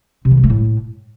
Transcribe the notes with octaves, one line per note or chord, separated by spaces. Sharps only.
C3
E3
C3
A3
A2